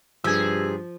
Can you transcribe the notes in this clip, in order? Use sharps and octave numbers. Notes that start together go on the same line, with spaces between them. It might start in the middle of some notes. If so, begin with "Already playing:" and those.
G2 C3 F3 G#4 E6 G#6